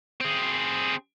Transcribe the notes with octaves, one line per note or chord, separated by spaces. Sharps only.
C4 G#4